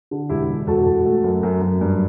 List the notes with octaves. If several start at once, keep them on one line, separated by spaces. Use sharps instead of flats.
D3
E1 E4 G4
E1
E1 F#4 A4
E1
A3
F#2
F#2
F#2
G2